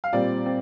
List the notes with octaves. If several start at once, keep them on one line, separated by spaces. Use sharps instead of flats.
F5
A#2 G3 C4 D5
C4